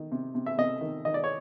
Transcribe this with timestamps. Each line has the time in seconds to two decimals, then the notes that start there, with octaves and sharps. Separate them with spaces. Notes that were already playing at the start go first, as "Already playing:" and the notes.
Already playing: D#3
0.12 C3
0.35 C3
0.46 E5
0.58 C3 D#5
0.81 D#3
1.05 D#3 D#5
1.14 D5
1.24 C#5